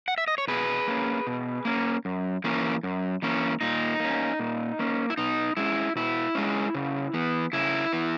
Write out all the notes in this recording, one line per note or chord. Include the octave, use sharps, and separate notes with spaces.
F#5
E5
D#5
C#5
B2 G#4 B4
A#3 C#4
B2
A#3 C#4
F#2
E3 A#3 C#4
F#2
E3 A#3 C#4
A#2 D#4
A#3 C#4
A#2
A#3 C#4
E4
B2 D#4
G#3 C#4 E4
B2 E4
G#3 C#4
C#3
E3 B3
C#3 E4
E3 B3